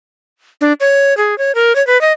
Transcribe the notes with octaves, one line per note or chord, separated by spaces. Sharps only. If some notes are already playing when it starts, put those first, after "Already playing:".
D4
C#5
G#4
C#5
A#4
C#5
B4
D#5